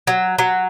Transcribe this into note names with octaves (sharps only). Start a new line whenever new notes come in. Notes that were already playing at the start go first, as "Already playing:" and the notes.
F#3
F#3